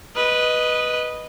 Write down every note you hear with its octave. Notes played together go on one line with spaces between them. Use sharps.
B4 D#5